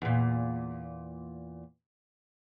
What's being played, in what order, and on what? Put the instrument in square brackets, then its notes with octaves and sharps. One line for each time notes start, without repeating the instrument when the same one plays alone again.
[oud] E2 A#2